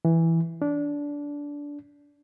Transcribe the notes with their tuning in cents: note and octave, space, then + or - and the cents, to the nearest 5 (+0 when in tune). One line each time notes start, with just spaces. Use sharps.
E3 +0
D4 -20